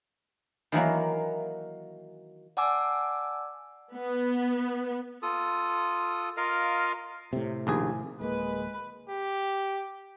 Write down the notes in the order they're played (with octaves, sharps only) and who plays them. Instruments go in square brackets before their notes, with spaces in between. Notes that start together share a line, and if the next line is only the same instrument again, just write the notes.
[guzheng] D#3 E3 F#3 A#3
[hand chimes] D5 F#5 G#5 A5 D6 E6
[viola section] B3
[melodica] F4 A4 D#6
F4 A#4 D#5 F5
[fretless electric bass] A2 C3
[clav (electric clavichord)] A#1 D#2 G#4
[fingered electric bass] D1 A#3 [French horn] G#3 [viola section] B4
[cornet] G4